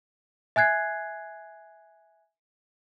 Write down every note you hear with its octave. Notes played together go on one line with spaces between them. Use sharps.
E5 G#5 F#6 G#6 C7